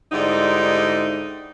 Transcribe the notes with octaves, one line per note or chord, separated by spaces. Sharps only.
G#2 D3 G3 D#4 E4